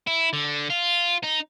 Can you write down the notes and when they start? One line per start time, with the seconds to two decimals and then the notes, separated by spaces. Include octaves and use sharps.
0.07 E4
0.33 D3
0.70 F4
1.23 D#4